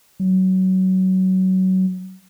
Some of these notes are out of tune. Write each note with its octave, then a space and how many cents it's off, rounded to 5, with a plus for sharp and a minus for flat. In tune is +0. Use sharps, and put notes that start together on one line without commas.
F#3 +20